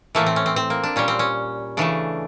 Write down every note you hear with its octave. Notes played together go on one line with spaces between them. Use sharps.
A2 E3 A3 A#3
C4
C#4
C4
C4
A#3
D4
A#2 G3 C#4
C4
C#4
C#3 E3 A3 D4